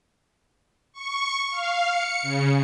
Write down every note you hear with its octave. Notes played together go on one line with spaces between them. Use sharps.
C#6
F5
C#7
C#3